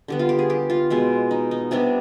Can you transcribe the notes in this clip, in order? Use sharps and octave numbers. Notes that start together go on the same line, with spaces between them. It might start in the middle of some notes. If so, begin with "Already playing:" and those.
D3 G3 B3
F4
G4
G#4
G4
F4
B2 G#3 B3
D#4
D#4
C3 G3 B3 D4